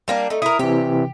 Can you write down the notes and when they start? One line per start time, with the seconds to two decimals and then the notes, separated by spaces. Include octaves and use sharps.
0.08 G3 A#3 D4
0.30 A3 D#4
0.42 E4 A#4 D#6
0.59 C3 E3 G4